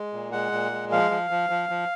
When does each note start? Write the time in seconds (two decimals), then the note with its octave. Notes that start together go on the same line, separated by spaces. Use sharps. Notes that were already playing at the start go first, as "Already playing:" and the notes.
Already playing: G#3
0.13 A#2
0.32 G#3 F#5
0.52 A#2
0.72 G#3
0.91 F3 F5
1.11 F3
1.30 F3
1.50 F3
1.69 F3